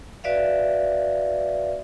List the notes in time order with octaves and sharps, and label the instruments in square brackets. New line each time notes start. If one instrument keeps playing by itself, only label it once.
[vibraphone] F#4 B4 D5 E5 F5